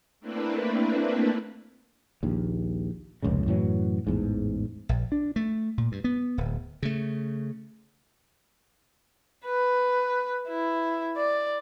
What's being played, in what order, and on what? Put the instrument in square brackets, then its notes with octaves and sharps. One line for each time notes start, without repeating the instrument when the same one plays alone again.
[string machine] A3 A#3 C4 D4 E4 B4
[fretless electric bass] A#1 D#2
F1 C#2 A#2 C#3
F#2 A2 E3 F#3
A1 E2 G#2
[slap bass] A#1
D4
A3
A#2
G2
B3
D1
C#3 A3
[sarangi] B4
E4
D5